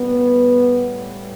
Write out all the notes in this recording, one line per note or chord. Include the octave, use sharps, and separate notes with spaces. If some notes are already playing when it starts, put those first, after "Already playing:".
Already playing: A2 G3 B3